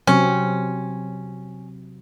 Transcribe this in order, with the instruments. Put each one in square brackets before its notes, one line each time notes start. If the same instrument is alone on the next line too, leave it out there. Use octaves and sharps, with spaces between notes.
[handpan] C3 F#3 C4 [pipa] C#4